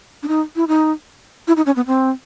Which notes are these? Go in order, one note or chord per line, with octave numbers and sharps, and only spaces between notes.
D4
D#4
E4
D#4
E4
D#4
C#4
B3
C4